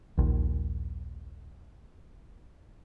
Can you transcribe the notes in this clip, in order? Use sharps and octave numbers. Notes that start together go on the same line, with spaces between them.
A#1 D#2